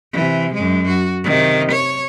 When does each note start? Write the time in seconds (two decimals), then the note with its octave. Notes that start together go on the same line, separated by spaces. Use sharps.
0.13 C3 E3
0.54 F#2 G#3
0.87 F#4
1.24 C3 D#3
1.72 C#5